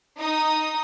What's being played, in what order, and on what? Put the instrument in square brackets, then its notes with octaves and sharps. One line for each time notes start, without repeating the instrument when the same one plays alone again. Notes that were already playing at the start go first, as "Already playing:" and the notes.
[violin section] D#4 D#6